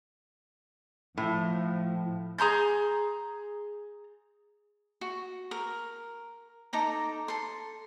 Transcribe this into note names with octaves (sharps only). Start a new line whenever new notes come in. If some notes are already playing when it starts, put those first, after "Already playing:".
A2 F3
G#4 A#5 C6 G6
F#4
A#4
D#4 A4 A#5 D6
A4 C6